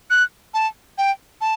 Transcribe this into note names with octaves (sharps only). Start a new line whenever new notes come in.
F#6
A5
G5
A5